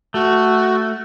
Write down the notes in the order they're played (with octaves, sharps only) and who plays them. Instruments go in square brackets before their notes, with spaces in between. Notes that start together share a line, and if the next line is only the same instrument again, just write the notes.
[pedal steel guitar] A3 [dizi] F#4